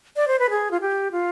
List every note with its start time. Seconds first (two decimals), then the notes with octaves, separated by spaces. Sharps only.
0.16 D5
0.28 C5
0.39 B4
0.50 G#4
0.71 F4
0.81 G4
1.12 F4